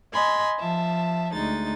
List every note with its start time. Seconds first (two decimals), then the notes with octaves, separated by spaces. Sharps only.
0.13 D#5 G#5 B5 C6
0.60 F3 E5 A5
1.33 D2 G#3 D#4 A6